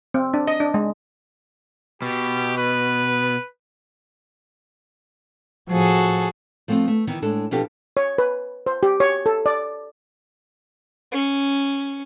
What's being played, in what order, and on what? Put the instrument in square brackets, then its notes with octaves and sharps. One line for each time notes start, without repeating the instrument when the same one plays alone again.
[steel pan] C4
D4
D#5
D4
G#3
[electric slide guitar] B2 [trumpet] G4
[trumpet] B4
[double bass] A2 F3 [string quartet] F#4 G#4 A4
[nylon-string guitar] F3 A3 B3 C4
A3
D#3 E3 B3 D#4
A2 G#3 D4 A4
B2 F3 D4 F#4 G4 A4
[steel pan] C#5
B4
C5
G4
C#5
A4
D5
[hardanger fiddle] C#4